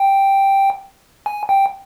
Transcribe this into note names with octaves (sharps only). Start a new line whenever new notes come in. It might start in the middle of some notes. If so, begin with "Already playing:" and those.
Already playing: G5
G#5
G5